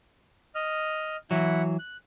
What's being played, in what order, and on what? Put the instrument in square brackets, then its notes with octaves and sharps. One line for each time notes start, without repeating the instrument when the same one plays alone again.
[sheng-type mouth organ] D#5 F6
[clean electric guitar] E3 F#3 [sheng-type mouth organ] E4 F#5
[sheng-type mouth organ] F#6